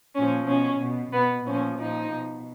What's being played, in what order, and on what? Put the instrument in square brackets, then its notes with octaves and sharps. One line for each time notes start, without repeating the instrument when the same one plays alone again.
[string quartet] A#2 F3 C#4
B2 C#4
B2
B2 B3
A#2 F3 C#4
A#2 F3 D#4
B2